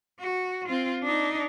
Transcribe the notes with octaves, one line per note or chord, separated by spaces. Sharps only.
F#4
C4 F4
D4 D#4